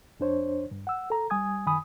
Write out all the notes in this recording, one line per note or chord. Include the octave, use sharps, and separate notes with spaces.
F2 D4 C5 C#5
G2
F#5 E6
A4 A#5
G3 G#5 D#6 G#6
F#2 D#3 G#5 B5 D#6